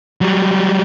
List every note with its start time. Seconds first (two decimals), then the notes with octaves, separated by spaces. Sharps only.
0.21 F#3 G3